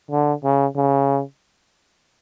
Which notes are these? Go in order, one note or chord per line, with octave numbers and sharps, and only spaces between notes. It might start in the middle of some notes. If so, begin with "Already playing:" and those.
D3
C#3
C#3